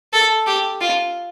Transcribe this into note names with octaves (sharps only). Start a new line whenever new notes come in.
A4
G4
F4